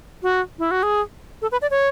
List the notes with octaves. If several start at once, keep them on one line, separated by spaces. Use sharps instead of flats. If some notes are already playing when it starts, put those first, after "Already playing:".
F#4
E4
F#4
G#4
A4
B4
D5
C#5